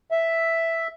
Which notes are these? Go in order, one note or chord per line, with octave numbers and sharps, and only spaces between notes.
E5